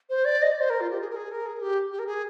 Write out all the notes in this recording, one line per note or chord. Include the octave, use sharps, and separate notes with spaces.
C5
D5
D#5
D5
C5
A#4
F4
G4
G#4
A#4
G#4
A#4
G#4
G4
G4
A#4
G#4